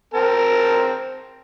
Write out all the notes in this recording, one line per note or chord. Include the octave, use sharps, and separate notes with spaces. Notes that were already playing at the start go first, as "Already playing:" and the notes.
C4 A#4 A5